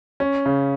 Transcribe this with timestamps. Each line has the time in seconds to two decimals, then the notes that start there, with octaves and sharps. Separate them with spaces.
0.20 C#4
0.46 C#3